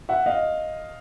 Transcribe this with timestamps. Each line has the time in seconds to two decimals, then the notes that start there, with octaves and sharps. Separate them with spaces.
0.09 E5 F#5
0.26 D#5 F5